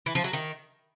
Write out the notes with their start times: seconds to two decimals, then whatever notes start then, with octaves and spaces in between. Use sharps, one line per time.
0.06 E3
0.15 F3
0.24 F#3
0.33 D#3